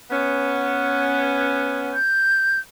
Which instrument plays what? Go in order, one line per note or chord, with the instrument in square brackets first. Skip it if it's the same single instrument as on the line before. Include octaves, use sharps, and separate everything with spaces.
[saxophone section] B3 C#4
[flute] G6